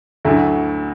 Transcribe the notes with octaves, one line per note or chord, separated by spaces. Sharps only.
D2 D3 F#3 A3 E4